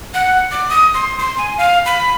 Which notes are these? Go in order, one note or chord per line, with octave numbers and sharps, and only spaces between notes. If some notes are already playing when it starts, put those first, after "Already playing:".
F#5
D6
D#6
C6
C6
G#5
F5
B5